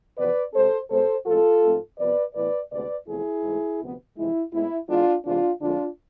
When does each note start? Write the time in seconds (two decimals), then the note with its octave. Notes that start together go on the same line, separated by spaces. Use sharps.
0.17 F2 C3 E3 B3 B4 D5
0.53 C3 G#3 C4 A4 C5
0.89 B2 G#3 B3 A4 C5
1.26 A2 F3 G#3 C4 F4 A4
1.63 G#2 F3 A3 C4
1.99 C3 F3 B3 B4 D5
2.35 A2 E3 B3 B4 D5
2.71 D2 C3 G#3 B3 B4 D5
3.08 E2 C3 F3 A3 C4 E4 G#4
3.44 G#2 E3 A3
3.80 D2 C3 F3 B3
4.17 F2 C3 E3 G#3 E4
4.52 A2 G#3 B3 E4
4.89 G#2 E3 G#3 B3 D4 F4
5.25 E2 C3 E3 G#3 D4 F4
5.62 F2 D3 G#3 D4 F4